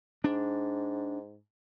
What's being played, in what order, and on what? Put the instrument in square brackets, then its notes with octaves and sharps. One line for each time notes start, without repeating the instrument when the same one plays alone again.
[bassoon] G#2 [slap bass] D4